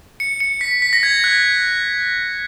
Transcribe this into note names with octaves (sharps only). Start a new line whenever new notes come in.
C#7
C#7
B6
B6
A#6
G#6
F#6